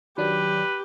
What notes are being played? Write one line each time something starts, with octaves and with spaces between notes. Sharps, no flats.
D#3 F#3 D4 G4 B4